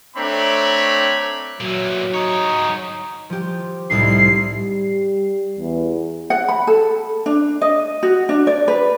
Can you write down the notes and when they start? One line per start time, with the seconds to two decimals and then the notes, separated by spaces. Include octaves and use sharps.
0.17 A3 C4 D4 C#5 A#5 B5
1.60 A#2 E3 F#3
2.14 G#2 D#4 C#5
3.30 F3 G4
3.90 C2 A2 D#4 C7
4.52 G3
5.59 E2
6.30 F#5
6.48 B5
6.67 A4
7.26 D4
7.61 D#5
8.03 F#4
8.29 D4
8.47 D5
8.68 B4